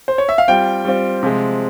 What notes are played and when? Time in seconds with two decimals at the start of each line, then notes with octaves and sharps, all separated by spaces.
0.08 C5
0.18 C#5
0.29 E5
0.38 F5
0.48 G3 C4 F4 G5
0.85 G3 C4 F4
1.23 C3 F3 G#3